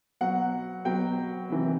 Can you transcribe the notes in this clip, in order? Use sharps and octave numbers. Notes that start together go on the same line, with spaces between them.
B2 F#3 F#5
B2 F#3 G5
C3 E3